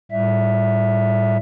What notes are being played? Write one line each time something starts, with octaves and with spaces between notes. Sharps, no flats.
A2 G3 E5